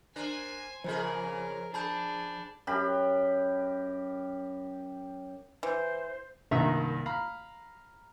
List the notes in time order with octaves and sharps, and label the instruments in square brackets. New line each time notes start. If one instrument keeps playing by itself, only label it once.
[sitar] D4 A#4 [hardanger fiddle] C5 G#5
[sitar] F2 C#3 G#4 [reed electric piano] F3 C5 [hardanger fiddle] A#4
[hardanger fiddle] D4 [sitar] G#4 [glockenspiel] A5 B5 G6
[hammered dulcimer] F#2 G4 B5
[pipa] E3 [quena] C5
[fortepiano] C2 G2 D#3 A#3 E5 A#5
F5 A#5 B5